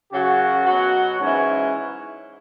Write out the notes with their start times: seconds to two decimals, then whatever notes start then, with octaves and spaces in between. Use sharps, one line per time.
0.11 F#2 C#3 F#3 F#4
0.65 B2 F#3
1.18 G#2 C#4
1.23 E3